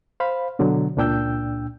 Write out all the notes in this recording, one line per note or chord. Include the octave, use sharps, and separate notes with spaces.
C5 F5 B5
B2 D3 F#3
C#2 A#2 D4 G5 E6 G6